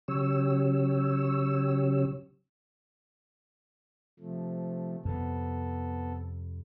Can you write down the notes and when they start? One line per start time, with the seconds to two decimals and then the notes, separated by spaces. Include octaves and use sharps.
0.08 C#3 F#3 C#4 G4 C#5 E6
4.19 C3 F3 A3
5.05 F2 C3 B3 A4